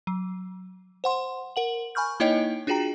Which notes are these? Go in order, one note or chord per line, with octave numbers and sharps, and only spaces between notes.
F#3
C5 F#5 C6
A#4 F#5 F#7
G#5 B5 C#6 F6 G6
A#3 D#4 E4 C#5 D#5 G5
D4 F4 F#4 G#4 G5 A#5